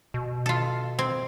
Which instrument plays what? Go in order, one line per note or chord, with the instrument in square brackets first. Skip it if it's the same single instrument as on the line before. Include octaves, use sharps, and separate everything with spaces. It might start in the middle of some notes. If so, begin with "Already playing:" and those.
[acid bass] B2
[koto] F4 A4
C4